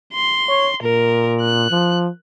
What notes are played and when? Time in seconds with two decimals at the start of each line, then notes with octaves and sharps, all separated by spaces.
0.13 C6
0.49 C#5
0.82 A#2 A#4
1.41 F#6
1.70 F3